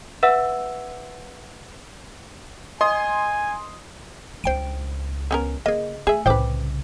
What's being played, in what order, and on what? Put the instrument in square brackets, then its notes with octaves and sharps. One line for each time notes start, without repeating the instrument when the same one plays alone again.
[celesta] B4 E5 F#5 E6
[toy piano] D#5 [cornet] G#5 [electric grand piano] C6 D#6
[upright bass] C#2 D4 [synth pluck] C5 G5 D7
[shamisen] B3 C#4 A#4
[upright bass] C#3 [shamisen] A#3 [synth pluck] G#4 D#5
[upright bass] A3 [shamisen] G#4 E5 [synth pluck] G#5
[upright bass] C2 C#3 [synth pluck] A2 C5 D6 [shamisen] B4 G5